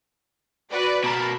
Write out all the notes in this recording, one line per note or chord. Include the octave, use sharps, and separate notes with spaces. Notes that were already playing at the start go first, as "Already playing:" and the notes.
F#4 B4 D5
B2 A#4 A5 B5